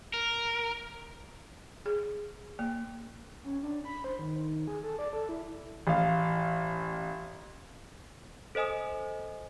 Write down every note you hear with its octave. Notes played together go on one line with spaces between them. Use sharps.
A#4
G#4
A#3
C#4
D4
B5
C5
D#3
G#4
A4
D5
A4
E4
A1 F5
A4 C5 D#5 G#5 D#6